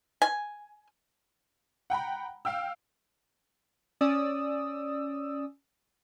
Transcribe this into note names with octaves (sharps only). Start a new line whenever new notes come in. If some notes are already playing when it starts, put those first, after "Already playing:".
G#5
F#5 G5 A#5 B5
F5 G5 E6
C#4 D5 D#6 E6